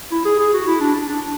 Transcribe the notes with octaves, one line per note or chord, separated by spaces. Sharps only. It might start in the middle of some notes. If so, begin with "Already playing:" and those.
E4
G#4
G#4
F#4
E4
D4
D4
D4